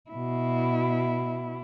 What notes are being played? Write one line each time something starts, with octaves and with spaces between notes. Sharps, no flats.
B2 E4